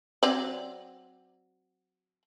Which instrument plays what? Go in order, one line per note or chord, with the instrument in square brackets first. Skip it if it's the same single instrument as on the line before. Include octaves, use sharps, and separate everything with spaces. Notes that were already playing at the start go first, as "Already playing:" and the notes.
[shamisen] F#3 C4 D5